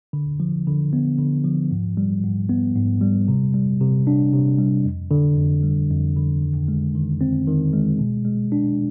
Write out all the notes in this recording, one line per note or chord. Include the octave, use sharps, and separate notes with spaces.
D3
F3
D3
B3
D3
F3
G#2
G3
G#2
B3
G#2
G3
C3
G3
C3
D4
C3
G3
F2
D3
F2
G3
F2
D3
D#3
G#3
D#3
C4
D#3
G#3
B2
G#3
D4